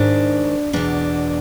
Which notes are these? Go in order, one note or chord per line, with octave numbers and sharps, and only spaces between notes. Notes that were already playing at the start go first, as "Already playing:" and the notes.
Already playing: G#2 D#3 D4
E2 B2 D4